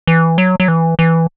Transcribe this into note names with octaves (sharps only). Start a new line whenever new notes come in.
E3
F#3
F#3
E3
E3